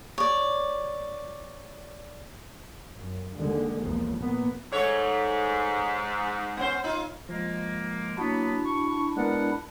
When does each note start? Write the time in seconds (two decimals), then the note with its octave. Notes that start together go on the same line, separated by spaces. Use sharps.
0.18 C#5 D5
2.93 F#2
3.34 D#2 D3 G#3
3.85 B1 E2 F3 A#3
4.21 A#2 B3
4.72 G#2 A3 A4 C#5
6.57 B3 C#4 C5
6.84 D#4 F4
7.29 F3 G#3 A#3
8.18 F#3 A#3 B3 D4 E4 F#4
8.65 C#6
9.16 G#3 B3 A#4 D5 F#5